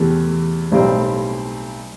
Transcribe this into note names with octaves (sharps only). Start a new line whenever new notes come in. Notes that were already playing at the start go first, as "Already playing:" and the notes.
Already playing: E2 C3 E3 A3
B1 A2 G3 C4